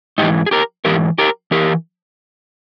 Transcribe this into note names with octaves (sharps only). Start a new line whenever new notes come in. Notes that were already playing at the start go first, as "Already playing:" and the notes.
G#2 E3 D#4 G4
G#4
G4 A#4
G#2 E3 G4 A#4
G4 A#4
E3 G4 A#4